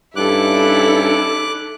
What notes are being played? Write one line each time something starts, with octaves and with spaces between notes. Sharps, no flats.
G2 C#4 D#4 E4 A4 D6 F#6